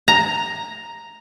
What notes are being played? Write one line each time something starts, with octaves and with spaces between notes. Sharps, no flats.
A#5